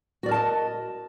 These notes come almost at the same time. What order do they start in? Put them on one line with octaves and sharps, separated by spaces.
F#4 D5 A#4 A5 D#5